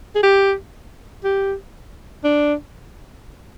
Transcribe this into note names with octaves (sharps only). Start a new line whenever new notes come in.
G#4
G4
G4
D4